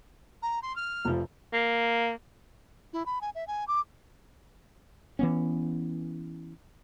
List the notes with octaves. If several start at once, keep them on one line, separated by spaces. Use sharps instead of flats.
A#5
C6
F6
F1 F3
A#3
E4
B5
G#5
E5
G#5
D6
E3 B3 C#4